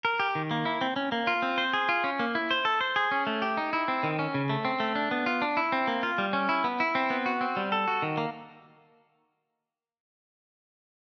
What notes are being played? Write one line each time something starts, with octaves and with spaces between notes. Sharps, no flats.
A#4
G4
D#3
A#3
E4
C4
C#4
A#3
F4
C4
C5
G#4
F4
C#4
A#3
E4
C5
A4
C5
G#4
C#4
A3
G4
D#4
E4
C4
D#3
C#4
C#3
A3
C4
A3
D4
B3
F4
D4
E4
C4
A#3
F4
G3
C#4
E4
B3
E4
C4
B3
F#4
C4
G3
A4
F#4
D#3
A#3